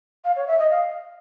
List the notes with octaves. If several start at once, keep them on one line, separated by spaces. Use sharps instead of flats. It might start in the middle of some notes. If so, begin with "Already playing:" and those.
F5
C#5
E5
D#5
F5